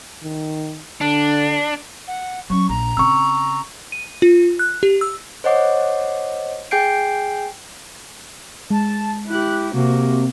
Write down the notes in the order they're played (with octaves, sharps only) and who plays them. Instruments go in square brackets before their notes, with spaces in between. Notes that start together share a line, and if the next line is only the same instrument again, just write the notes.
[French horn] D#3
[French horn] D3 [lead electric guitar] D4
[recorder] F#5
[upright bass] F#3 C#4 [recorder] C#6
[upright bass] A#1 [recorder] A#5
[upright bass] C#3 C4 [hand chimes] C#6 E6
[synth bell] D#7
F4
F#6
G4
E6
[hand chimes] C5 C#5 D#5 F#5 D6
G#4 G5 G#5 G6 C7 D7
[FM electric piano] G#3 [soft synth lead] A5
[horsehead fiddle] E4 G4 [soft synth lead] F#6
[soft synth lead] C3 [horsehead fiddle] A#3 F#4